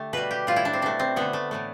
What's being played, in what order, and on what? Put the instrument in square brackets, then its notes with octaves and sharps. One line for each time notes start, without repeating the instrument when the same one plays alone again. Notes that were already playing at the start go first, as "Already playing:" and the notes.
Already playing: [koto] D3 A3 G4
B2 G3 B4
G4
A2 G3 F4
E4
D4
C4
B2 A3 D4
C4
D3 A3 B3
A3
A2 E3 A3